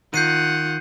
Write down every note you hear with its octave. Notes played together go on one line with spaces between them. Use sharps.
D#3 F4 F#5 G6 C7 D#7